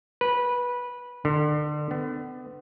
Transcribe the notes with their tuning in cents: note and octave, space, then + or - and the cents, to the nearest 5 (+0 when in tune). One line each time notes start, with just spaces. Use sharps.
B4 -15
D3 +30
B3 +35